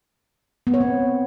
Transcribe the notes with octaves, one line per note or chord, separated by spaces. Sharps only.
B3
C#5
C4